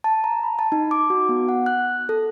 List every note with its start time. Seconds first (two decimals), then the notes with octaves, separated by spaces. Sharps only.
0.04 A5
0.24 A#5
0.43 B5
0.59 A5
0.72 D#4
0.91 D6
1.10 F#4
1.29 B3
1.49 F#5
1.66 F#6
2.09 A4